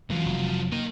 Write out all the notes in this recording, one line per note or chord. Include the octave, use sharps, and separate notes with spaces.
C#3 E3 F#3 A3 F4
F1
A#3 A#4 D#5